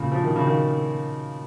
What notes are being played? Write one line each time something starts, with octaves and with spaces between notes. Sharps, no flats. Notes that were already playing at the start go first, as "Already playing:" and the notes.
Already playing: A#2 C#3
F3
D#3
C#3
D#3